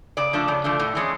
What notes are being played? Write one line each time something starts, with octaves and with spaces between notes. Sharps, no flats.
C#3 D5
F3 A3 D4
C#3
F3 A3 D4
A2
E3 G#3 C#4